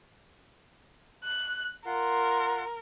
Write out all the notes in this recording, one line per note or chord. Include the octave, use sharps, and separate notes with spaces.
F#6
F4 A#4 F#5 C6